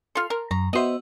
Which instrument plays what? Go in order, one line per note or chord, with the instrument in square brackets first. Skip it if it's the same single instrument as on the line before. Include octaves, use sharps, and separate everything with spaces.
[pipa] F4 A4 [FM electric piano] C6 F6
[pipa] A#4
[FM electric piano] F#2 [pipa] A#5
[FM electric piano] B3 F#4 E5 [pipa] C5 D#5